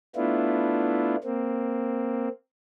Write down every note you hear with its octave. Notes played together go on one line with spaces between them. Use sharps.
A3 B3 D4 E4 F4
A#3 C4